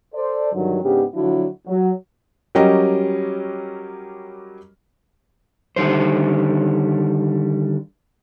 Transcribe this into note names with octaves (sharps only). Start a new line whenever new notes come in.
A4 C5 D5
G2 D3 D#3 F#3
G#2 C#3 B3 D4 G4
D3 F3 F#3 D4 E4 F#4
F#3
F#3 G3 C#4 G4 A#4 D#5
D3 D#3 G3 C5